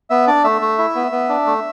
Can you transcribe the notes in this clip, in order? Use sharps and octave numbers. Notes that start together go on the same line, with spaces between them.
B3 E5
D4 D5
A3 E5
A3
E4
B3
B3
D4
A3